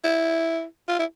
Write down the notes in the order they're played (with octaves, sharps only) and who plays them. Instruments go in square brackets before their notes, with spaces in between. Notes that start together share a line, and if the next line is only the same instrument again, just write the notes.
[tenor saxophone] E4
F4
E4